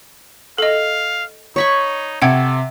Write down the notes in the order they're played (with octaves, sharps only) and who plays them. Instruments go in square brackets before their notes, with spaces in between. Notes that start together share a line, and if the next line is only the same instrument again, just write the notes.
[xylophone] A4 D#5 [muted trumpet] F5
[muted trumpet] D#4 [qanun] C#5 B5 C#6
[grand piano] C3 [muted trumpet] A4 [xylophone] F#5 G5 G#6